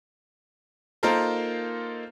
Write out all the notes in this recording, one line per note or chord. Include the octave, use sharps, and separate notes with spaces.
A#3 D#4 F4 A4 A#4 C5